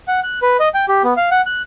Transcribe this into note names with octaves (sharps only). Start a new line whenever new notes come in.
F#5
F#6
B4
D#5
G5
G4
B3
F5
F#5
F#6